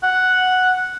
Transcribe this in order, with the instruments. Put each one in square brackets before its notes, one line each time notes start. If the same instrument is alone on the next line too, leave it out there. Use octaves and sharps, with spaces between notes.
[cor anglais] F#5